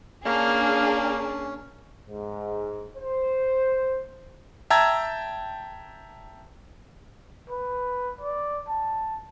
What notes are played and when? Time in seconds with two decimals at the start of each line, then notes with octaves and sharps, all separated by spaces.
0.25 A#3 C#4 D4 G#4
2.09 G#2
2.97 C5
4.70 E5 G5 A5 A#5 E6 G#6
7.50 B4
8.21 D5
8.68 A5